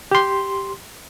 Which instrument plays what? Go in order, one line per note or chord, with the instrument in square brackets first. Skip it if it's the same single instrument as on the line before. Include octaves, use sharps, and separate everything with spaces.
[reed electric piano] G4 C6